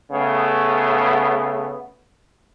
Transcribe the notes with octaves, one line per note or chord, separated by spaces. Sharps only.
C#3 A3 B3